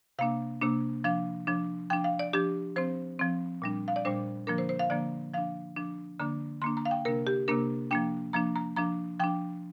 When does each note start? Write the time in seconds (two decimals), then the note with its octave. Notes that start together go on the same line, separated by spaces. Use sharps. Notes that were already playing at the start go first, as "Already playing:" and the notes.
0.19 C3 A#3 D4 F5
0.61 C3 A#3 D4
1.04 F3 D4 F5
1.47 F3 D4
1.90 F3 D4 G5
2.04 F5
2.19 D5
2.33 F3 D4 G4
2.76 F3 C4 C5
3.19 F3 C4
3.62 A#2 G3 D4
3.88 F5
3.96 D5
4.05 A#2 G3 D4 C5
4.47 D3 F3 A#3 D4 A#4
4.58 C5
4.69 C5
4.79 F5
4.90 D3 F3 A#3 D4 D5
5.34 F3 D4 F5
5.76 F3 D4
6.20 D3 A#3 D4 A#5
6.62 D3 A#3 D4 C6
6.77 A#5
6.85 F5
6.91 G5
7.05 C3 A#3 D4 A#4
7.27 G4
7.48 C3 A#3 D4 A#4
7.91 F3 A#3 D4 G5
8.33 F3 A#3 D4 A#5
8.56 A#5
8.76 F3 D4 A#5
9.20 F3 D4 G5